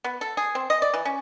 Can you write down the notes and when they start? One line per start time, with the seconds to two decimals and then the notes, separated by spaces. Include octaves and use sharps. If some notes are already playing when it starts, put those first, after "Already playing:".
0.04 B3
0.21 A4
0.37 G#4
0.55 C4
0.70 D#5
0.82 D5
0.94 E3
1.05 C#4